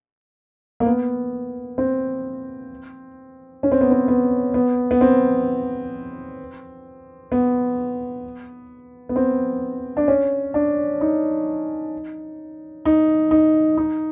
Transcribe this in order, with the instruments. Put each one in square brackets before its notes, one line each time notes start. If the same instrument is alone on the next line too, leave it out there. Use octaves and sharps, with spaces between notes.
[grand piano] A#3
B3
C4
C#4
C4
B3
C4
B3
B3
B3
C4
B3
B3
C4
D4
C#4
D4
D#4
D#4
D#4
D#4